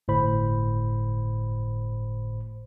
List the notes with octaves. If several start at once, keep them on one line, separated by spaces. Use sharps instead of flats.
G1 A2 C5 B5